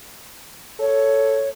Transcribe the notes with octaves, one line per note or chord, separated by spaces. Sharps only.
A4 C#5